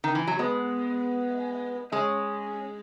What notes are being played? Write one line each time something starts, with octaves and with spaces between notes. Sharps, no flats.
D#3
E3
F#3
G#3 B3
G#3 C#4